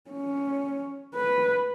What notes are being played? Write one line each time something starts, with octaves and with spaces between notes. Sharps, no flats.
C#4
B4